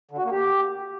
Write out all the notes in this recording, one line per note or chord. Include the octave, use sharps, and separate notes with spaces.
D3
F#4
A#3
G4